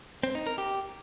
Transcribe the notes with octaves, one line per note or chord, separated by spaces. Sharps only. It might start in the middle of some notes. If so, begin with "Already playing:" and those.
C4
D#4
A#4
G4